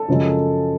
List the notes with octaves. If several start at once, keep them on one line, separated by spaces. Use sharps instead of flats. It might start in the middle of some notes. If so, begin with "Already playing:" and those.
Already playing: A4
F#2 C#3 F3 G#3